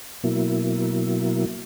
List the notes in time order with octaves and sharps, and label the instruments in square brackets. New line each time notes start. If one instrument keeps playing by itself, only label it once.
[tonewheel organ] B2 F#3 A#3 E4